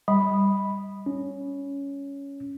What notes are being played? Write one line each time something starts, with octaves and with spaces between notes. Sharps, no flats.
G3 B5
C#4